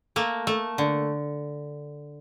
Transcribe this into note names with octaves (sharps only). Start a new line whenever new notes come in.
A3 A#3
A3
D3